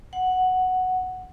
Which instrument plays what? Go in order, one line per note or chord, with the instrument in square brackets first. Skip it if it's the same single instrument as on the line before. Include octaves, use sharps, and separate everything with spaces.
[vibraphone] F#5